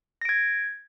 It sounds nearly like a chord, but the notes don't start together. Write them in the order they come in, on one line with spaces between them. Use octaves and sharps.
A#6 D7 G#6